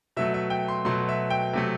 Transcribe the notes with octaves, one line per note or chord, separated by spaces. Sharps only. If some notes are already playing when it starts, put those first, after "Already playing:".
B2 F#3 A3 E5
E5
G5
C6
B2 F#3 A3 C6
E5
G5
C3 F#3 A3